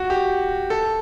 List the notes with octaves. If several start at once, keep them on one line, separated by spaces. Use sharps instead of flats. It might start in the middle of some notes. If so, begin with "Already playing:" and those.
Already playing: F#4
G4
A4